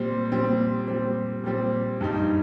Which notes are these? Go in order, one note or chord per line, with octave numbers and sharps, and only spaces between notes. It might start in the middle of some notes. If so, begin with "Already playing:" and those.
Already playing: A#2 G3 C4
A#2 G3 C4
A#2 G3 C4
A#2 G3 C4
G2 G3 D#4